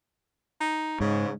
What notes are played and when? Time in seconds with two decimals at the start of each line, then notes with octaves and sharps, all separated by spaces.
0.61 D#4
1.01 G#2 C#3